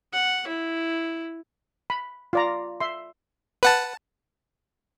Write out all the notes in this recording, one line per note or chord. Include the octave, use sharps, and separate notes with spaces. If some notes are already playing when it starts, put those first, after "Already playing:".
F#5
E4
B5
F4 D5 A#5
E5 C6
B4 F#5 A5